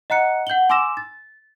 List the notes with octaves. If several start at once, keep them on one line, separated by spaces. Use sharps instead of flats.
D#5 F#5 A#5 F#6 C#7
F#5 G6 F#7 G7
G#5 C6 D6 E6 A#6 E7
A6